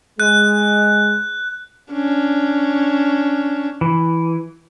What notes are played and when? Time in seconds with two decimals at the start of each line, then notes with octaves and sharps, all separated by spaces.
0.20 G#3 F#6
1.93 C#4 D4
3.81 E3